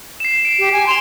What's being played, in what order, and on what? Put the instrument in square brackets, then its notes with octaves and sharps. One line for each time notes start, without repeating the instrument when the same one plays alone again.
[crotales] C7 E7
D7
[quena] G4
G#5
[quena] C6 [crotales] D7 E7 F7